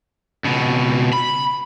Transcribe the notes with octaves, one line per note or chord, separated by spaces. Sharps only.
C#2 B2
B5